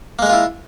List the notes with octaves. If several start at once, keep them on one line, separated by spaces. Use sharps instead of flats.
G#3 A#3 E4 F4 A#4